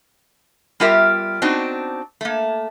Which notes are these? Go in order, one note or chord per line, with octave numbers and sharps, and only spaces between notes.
G3 B3 F4 G4 A#4 E5
B3 C4 D4 D#4 F#4
A3 A#3